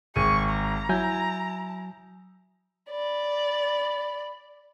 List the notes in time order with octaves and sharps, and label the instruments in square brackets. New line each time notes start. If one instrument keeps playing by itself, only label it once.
[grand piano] G#1 G#4 D#7 [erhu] C#6
[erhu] A#5
[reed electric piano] F#3 G#5 G6 [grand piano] E4
[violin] D5 B5